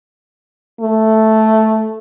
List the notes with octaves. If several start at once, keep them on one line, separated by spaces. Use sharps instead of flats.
A3